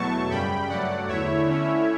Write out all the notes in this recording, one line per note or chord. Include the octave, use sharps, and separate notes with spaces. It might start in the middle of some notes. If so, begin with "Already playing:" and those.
Already playing: E2 B2 F#3 A3 A5 C#6
F#2 C#3 G3 G5 B5
G2 F#3 A3 D5 F#5
E2 D3 A3 E4 C#5 E5
D3 A3 C#4 E4